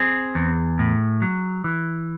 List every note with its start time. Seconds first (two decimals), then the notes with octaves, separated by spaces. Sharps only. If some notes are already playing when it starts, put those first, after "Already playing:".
Already playing: C4 G#4
0.35 E2
0.79 A2
1.22 F#3
1.64 E3